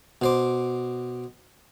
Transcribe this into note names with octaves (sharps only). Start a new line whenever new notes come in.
B2 C5 D6